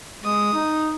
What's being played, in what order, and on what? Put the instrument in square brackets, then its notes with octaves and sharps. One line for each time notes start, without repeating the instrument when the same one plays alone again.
[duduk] G#3 [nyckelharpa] D#6
[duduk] D#4